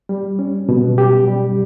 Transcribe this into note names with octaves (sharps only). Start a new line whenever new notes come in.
G3
C#4
B2
G4
G3